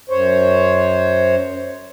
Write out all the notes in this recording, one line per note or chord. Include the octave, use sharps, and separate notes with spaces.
F#2 C5 C#5